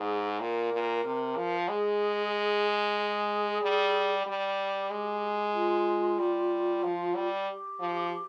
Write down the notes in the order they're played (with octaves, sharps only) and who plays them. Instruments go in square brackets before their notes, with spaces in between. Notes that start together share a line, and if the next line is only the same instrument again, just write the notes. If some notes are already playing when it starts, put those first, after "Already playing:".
Already playing: [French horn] G#2 [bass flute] G#4
[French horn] A#2 [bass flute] A#4
[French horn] A#2
C3
F3
[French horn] G#3 [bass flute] G#4
[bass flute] G#4
[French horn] G3
[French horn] G3 [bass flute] G4
[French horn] G#3
[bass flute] F4
[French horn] G3
F3
G3
[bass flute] G4
[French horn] F3